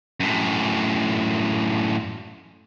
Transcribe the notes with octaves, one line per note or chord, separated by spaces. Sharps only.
F#2 A2